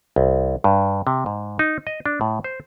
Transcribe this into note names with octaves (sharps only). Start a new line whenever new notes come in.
C2
G2
C3
G#2
D#4
D#5
D4
A2
C5